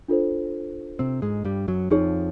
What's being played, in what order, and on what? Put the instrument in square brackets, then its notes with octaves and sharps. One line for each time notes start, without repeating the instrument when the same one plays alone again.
[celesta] D4 F4 A4 C5
[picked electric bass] C3 C4
G#2 G#3
G2 G3
F#2 F#3
[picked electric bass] F2 F3 [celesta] D#4 G#4 C#5